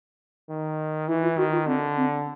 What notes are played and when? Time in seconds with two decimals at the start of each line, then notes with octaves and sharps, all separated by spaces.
0.49 D#3
1.08 E3 E4
1.23 F4
1.37 D#3 F#4
1.52 F4
1.67 D3 C4
1.96 C4